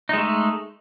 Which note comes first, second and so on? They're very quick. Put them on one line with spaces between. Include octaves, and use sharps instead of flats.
D#4 G#3 A3